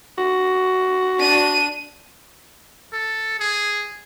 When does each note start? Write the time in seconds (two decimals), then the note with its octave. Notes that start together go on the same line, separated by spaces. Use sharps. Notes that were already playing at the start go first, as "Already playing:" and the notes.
0.18 F#4
1.19 D4 D#7
2.93 A4
3.40 G#4